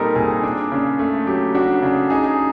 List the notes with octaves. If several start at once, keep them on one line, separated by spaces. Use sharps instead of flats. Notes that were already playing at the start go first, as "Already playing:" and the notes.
Already playing: A#2 G3 C4 D#4 A4 A#4
A#2 G#4
D4
C#3
A3
F#3 G4
D4 F#4
C#3
D#4 G#4